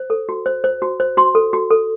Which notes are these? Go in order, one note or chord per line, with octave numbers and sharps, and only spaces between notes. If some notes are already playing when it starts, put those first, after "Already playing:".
Already playing: C5
A4
F#4
C5
C5
F#4
C5
F#4 C6
A4
F#4
A4